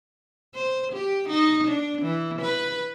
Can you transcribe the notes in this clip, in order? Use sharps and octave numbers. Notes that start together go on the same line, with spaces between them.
C5
G4
D#4
D4
E3
B4